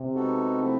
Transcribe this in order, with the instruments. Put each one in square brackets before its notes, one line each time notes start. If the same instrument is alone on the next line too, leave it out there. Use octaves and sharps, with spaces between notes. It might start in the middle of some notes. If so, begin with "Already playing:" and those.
Already playing: [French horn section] C3
[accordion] G#3 B3 D#4 F#4 A4
F3 A3 C4 E4